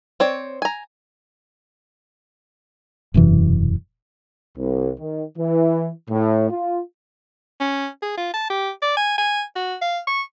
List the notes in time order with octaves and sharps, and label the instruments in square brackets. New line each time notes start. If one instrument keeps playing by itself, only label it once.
[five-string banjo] C4 C#5 D5
G#5 A#5
[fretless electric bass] E1 F#2 C3 E3
[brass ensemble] C2
D#3
E3
A2
F4
[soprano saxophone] C#4
G#4
F4
A5
G4
D5
G#5
G#5
F#4
F5
C#6